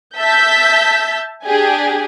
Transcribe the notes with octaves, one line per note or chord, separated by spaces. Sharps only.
E5 A5 E6 G6 B6
D4 G4 G#4 G#5